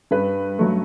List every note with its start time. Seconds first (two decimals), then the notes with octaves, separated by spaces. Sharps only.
0.11 G2 B4
0.59 F#3 A3